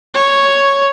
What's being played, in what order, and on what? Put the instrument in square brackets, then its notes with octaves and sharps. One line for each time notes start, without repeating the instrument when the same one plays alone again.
[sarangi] C#5